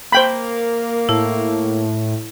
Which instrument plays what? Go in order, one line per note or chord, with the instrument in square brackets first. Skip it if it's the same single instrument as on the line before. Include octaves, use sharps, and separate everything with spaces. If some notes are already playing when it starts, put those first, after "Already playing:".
[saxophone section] A#3 [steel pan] C5 G5 B5
[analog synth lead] A2 [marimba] E4